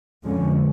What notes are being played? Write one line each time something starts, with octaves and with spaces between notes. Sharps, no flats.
F2 D3 F3 G#3 C#4